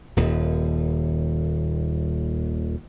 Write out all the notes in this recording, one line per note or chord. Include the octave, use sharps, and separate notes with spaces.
D#1 D#2